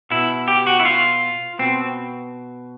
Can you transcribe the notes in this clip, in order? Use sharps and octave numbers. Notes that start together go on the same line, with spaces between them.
B2 E4
G4
F#4
E4
F4
B2 C4